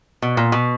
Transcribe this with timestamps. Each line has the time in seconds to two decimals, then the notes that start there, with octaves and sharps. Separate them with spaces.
0.22 B2
0.37 A#2
0.52 B2